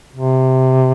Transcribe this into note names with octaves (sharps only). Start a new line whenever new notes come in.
C3